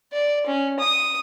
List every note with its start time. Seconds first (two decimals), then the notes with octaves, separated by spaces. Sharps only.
0.12 D5
0.46 C#4
0.79 D#6